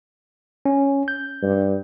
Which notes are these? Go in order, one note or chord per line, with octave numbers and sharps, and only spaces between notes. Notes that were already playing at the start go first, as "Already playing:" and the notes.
C#4
G6
G2